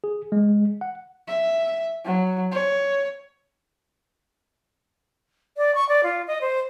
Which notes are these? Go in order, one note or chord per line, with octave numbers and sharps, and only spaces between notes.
G#4
G#3
F#5
E5
F#3
C#5
D5
C#6
D5
F4
D#5
C5